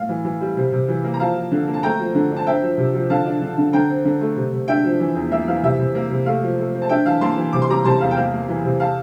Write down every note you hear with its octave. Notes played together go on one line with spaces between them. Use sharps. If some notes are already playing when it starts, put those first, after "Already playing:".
Already playing: A2 F5
E3
E3
G3
C3
C3
E3
A#3
A#5
F3 F5 A5
F3
D3
A#3
A5
A3 G5 A#5
F3
D3
D4
A5
C4 E5 G5
F3
C3
F3
D3 F5 A5
D4
D3
D3
D3 G5 A#5
C4
D3
A3
C3
C3
D4 E5 G5
F3
E3
E2
A#3 E5
E3 F5
C3 E5
C3
A#3
C3
A3 F5
F3
A3
C4
A5
D4 E5 G5
E3 F5 A5
A#3 A5 C6
E3
C3 D6
C6
G3 A#5 D6
C3 A5 C6
E2 F5
G5
A#3 F5
A#3
E3
C3
F5 A5